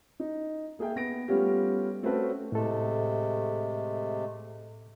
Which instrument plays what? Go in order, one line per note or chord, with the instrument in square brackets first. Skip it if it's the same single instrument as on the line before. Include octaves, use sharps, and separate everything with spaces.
[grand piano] D#4
A#3 G#4 E5 G5
B3 A#6 D7
G3 A3 B3 C#4 F4 G4
A3 C4 C#4 F#4 B4 A5
[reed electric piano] A2 A4 [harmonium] C3 G#3 A3